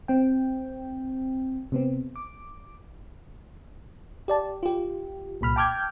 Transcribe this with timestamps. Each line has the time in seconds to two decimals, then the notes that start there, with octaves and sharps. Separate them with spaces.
0.08 C4 G5
1.72 C3 B3 C4
2.16 D6
4.28 G4 D5 A5
4.63 F4 G4
5.41 C2 A#2 B5 F6
5.56 G5 A5 D6 F6 G6 G#6